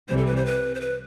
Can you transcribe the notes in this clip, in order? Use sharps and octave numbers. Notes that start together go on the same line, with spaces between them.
C2 C3 E3 G3 C5
A4
B4
C5
B4
C5
B4